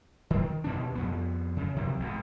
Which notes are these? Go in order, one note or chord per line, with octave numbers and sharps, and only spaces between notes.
D#3
D#2 B2 D4
F2 B3
C#3
D#2 C3 D#3 F#3
G#1 G#2 B2